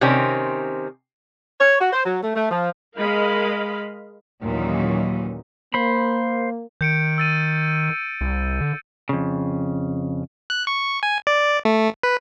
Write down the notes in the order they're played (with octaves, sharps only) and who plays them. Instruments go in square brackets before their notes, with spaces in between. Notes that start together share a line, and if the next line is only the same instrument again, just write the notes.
[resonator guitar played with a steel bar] C3 D#3 C4 C#4
[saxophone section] C#5
F#4
C5
F#3
A3
A3
F3
[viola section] G#3 A#4 D#5 F5 B5
[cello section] D#2 A#2 E3 F#3 C#4 D#4
[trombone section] A#3 [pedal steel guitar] C5 B5
[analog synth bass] D#3 [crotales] G6 C#7 D7
[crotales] E6 A6 D#7
[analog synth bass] C2
D3
[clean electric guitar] F2 C#3
[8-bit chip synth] F#6
C#6
G#5
D5
A3
B4